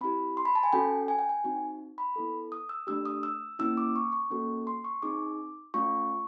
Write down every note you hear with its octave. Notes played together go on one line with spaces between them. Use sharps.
C4 E4 G4 B5
C6
B5
A5
G#5
C#4 F#4 A4 G5
G#5
G5
G#5
C4 D#4 F#4
B5
B3 E4 A4
D#6
E6
A3 D4 G4 E6
D#6
E6
A#3 C#4 E4 E6
D6
C#6
C#6
A#3 C#4 F#4 A4
C6
C#6
C4 D#4 G#4 D6
A3 C#4 F4 C#6